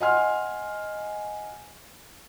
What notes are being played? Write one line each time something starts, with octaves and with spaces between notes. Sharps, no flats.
D#5 F#5 G#5 C6 F6